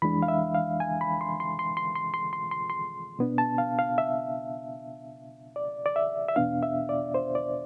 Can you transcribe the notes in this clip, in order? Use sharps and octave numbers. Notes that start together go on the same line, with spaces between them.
F2 E3 G#3 D4 B5
F5
E5
F5
G#5
B5
C6
C6
C6
C6
C6
C6
C6
C6
C6
B2 B3 D4
A5
F5
F5
E5
D5
D5
E5
E5
E2 B2 B3 D4 F5
E5
D5
C5
D5